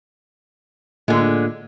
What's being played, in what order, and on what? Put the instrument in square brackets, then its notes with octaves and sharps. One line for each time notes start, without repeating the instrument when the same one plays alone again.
[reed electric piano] A2 A#3 F4 [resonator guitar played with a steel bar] D3 G#3